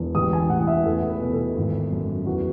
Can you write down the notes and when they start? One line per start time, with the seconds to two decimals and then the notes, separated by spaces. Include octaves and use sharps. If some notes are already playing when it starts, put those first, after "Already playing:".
Already playing: E1 E2
0.15 A1 D#6
0.33 G#5
0.50 A2 F#5
0.67 E5
0.86 E2 A4
1.09 B4
1.21 B2
1.33 A4
1.56 G#1
1.92 F#2
2.26 E2 F#4